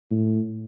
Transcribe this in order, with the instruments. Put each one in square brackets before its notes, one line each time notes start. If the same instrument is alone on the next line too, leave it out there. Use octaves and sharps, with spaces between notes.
[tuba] A2